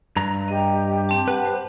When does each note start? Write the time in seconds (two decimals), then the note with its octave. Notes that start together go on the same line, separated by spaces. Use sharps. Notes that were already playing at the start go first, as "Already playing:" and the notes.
0.16 G2 A#5
0.48 G4 D#5
1.09 C4 A5
1.28 B4 F#5 A5
1.46 C5